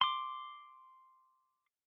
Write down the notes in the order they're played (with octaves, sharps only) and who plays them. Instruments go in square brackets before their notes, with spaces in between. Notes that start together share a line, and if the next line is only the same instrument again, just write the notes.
[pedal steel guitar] C6 D6